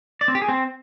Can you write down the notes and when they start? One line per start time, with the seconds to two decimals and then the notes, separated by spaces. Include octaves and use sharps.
0.21 D5
0.28 C4
0.35 G4
0.42 G#4
0.49 C4